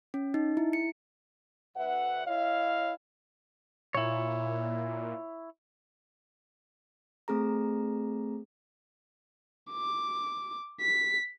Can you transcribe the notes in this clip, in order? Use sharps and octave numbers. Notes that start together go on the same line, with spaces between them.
C#4
D#4
E4
C#7
D2 B4 E5 F#5
E4 C#5 D#5 F5
A#2 E4 C#5
A3 C4 G#4 A#5
D6
B6